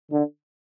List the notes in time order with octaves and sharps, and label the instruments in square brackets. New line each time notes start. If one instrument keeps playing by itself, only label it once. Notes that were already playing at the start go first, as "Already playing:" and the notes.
[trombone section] D3